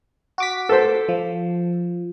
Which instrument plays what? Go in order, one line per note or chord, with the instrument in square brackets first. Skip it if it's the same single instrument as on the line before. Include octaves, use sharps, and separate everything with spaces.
[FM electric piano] F#4 D6 B6
[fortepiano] A4 C5
[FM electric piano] F3